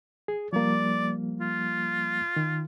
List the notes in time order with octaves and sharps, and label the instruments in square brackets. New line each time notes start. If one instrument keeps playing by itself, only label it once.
[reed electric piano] G#4
[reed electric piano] F3 G3 A#3 [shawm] D5
[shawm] F4
[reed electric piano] D#3